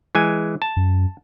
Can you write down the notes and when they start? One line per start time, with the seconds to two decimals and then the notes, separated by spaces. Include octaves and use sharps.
0.15 E3 G#3 G#5
0.62 A5
0.77 F#2